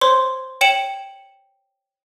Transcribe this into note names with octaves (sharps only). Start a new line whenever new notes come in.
C5 C#5 C6
C#5 G5 C#7 E7 F#7